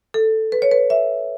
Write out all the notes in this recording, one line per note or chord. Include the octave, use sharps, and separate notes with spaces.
A4
B4
C#5
B4
E5